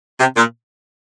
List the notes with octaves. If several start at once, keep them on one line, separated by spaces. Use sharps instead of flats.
C3
A#2